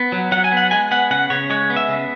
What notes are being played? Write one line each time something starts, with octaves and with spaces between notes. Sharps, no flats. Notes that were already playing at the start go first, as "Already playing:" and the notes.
Already playing: B3
F#3
F#3 F#5
G#5
B3 F#5
G#3 G#5
B3 F#5
C#3 F#5
C#3 C#5
G#3 C#5
B3
E5
C#3